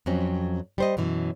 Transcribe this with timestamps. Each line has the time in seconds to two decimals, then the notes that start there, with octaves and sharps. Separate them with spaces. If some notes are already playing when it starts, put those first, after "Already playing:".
0.06 F2 F#3 C4 C#4
0.78 G3 C5 D#5
0.97 F#2 B2 E3 F#3